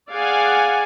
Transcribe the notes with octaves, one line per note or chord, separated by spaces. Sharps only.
G#4 D5 F5 F#5 G#5